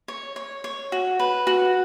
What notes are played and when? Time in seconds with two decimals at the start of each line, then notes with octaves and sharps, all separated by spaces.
0.08 C#5
0.36 C#5
0.64 C#5
0.92 F#4
1.20 B4
1.47 F#4